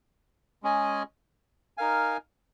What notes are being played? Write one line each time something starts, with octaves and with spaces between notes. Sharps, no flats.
G#3 C#4 G#4 D#5 G#5
D#4 A#4 F5 G#5